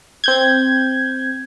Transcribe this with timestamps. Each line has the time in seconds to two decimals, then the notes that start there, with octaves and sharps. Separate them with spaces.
0.24 C4 G6 G#6